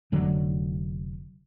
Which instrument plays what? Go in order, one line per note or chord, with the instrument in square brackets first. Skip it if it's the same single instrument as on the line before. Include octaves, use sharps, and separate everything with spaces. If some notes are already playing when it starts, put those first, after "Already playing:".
[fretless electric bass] F1 D3 F#3